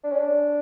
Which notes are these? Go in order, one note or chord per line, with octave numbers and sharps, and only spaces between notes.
D4
C#4
D4